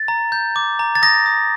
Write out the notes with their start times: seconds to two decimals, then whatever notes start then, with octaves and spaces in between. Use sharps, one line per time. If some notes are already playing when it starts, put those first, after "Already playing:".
Already playing: A6
0.08 A#5
0.32 G6
0.56 D6
0.79 A#5
0.95 A6
1.02 D#6 A#6
1.26 D#6